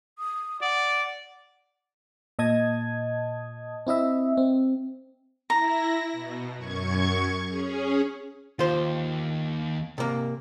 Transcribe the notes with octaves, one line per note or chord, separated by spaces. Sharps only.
D#6
D5 F#5
A#2 D#5 A5 D#6 G#6
C4 E4 D#5 E5
C4
E4 A#5 A#6
B2
F#2 C#6 G#6
C#4 G#4
D#2 F4 C5
C3 A#3